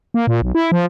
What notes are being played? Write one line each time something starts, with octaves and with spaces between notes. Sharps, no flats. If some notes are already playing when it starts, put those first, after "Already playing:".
A#3
A#2
B1
E4
F3